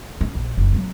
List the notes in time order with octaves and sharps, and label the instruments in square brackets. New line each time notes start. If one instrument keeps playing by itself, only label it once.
[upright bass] C#4
A#1
F#1
F#3 C4